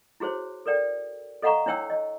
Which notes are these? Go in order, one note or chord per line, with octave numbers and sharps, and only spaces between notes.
E4 F#4 G#4 C5 C#5
A4 A#4 D5 G5
A4 D#5 F5 F#5 A#5 C#6
D4 E4 C#5 G5 E6
D#5